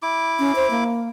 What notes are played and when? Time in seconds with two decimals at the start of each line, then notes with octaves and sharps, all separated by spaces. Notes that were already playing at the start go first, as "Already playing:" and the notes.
0.03 E4 D6
0.39 C#4
0.56 C5
0.71 A#3